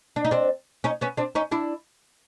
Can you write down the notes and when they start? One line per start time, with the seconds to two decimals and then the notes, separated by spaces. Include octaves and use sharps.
0.16 D4
0.25 D#4
0.31 C4 D4
0.84 C#4 D#4
1.01 B3 C#4
1.17 C4 D4
1.35 C#4 D#4
1.51 D4 E4